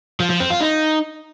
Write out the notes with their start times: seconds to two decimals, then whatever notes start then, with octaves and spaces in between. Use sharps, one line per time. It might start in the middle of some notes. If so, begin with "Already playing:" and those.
0.20 F3
0.30 F3
0.40 C4
0.50 F4
0.61 D#4